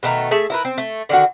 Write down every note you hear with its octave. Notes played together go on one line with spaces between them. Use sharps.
B2 D#3 A3 A#5
A3 G#4 E5 A5
E4 A#4 B4
C4
A3
D3 D#3 F#4